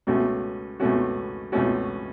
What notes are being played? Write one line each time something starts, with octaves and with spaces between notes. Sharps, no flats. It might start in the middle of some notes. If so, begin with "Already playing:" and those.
C#2 B2 A3 C#4 F#4
C#2 B2 A3 C#4 F#4
C#2 B2 A3 C#4 F#4